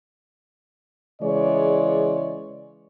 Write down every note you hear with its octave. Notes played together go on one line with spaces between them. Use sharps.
C#3 E3 G#3 C#5 D5